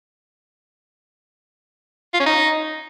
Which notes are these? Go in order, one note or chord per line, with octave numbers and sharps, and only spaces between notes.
F4
C#4
D#4